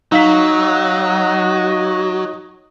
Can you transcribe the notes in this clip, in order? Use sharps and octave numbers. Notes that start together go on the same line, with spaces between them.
F#3 D#4 C#5 D#5 F5 B6